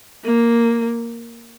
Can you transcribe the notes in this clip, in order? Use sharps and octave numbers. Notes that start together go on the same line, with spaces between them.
A#3